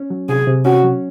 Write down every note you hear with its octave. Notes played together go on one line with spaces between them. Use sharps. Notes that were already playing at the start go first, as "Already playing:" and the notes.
Already playing: C#4
F#3
C3 G#4
C3
C#4 F#4
F#3